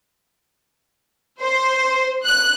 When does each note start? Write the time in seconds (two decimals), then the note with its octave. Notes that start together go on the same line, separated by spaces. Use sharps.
1.41 C5
2.26 F#6